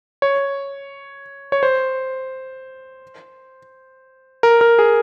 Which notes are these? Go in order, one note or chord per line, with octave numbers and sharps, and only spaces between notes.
C#5
C#5
C5
A#4
A#4
G#4